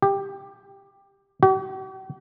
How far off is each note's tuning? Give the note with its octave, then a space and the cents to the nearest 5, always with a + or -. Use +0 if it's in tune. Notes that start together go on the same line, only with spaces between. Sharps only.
G4 +15
G4 -45